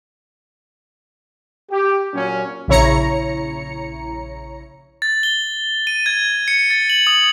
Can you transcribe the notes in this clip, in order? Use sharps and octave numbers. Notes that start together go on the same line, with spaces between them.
G4
A#2 F#3 C#4
A#1 C#3 E4 C#5 A#5 C#7
A6
G7
D#7
G#6
C#7
A6
F#7
D#6